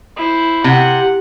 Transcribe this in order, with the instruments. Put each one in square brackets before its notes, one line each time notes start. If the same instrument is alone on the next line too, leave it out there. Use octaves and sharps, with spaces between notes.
[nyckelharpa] E4 C5
[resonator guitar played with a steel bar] C3 [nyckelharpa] F#5